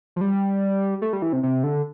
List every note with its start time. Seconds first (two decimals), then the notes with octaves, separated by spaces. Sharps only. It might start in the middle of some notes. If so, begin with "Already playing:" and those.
0.16 F3
0.21 G3
1.02 A3
1.13 G3
1.22 E3
1.33 C3
1.43 C3
1.63 D3